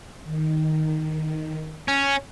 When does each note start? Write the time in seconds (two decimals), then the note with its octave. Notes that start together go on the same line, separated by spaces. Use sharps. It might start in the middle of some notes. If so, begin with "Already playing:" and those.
0.24 D#3
1.88 C#4